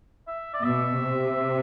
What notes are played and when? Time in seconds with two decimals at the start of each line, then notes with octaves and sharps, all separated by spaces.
0.27 E5
0.54 D5
0.63 B2 E5
0.99 C3